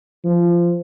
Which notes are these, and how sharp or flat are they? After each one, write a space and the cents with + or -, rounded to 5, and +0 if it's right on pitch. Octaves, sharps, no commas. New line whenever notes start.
F3 -15